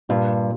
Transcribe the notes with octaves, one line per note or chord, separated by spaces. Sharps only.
G2 A#2